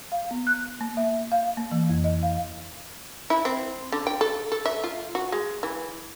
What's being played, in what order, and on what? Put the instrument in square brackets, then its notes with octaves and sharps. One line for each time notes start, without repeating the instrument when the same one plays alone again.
[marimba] F5
B3
F#6
A#3
E5
F5
A#3
E3
F2
D#5
F5
[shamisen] E4
C4
D3
G5
A4
A4
E5
F4
F#4
G#3
E3